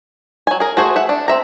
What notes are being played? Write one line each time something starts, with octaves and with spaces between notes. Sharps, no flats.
F#3 G#5
G#4 A#4
A3 F#4 G#4 C5
E5 F#5
D4
C4 E5 A#5